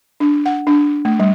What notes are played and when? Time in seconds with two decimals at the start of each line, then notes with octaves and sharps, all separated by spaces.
0.20 D4
0.46 F#5
0.67 D4
1.05 A3
1.20 G3